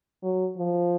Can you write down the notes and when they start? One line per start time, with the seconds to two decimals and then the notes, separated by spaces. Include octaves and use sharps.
0.23 F#3
0.58 F3